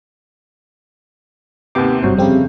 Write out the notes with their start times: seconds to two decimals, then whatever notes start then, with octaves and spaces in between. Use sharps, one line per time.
1.75 D#2 C3 B3 G4 D6
2.03 G#1 G2 C3 F#3 F#4 C5
2.17 F2 C#3 G3 C4 G4